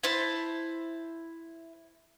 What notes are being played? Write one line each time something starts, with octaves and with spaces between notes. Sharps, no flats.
E4 C5 A5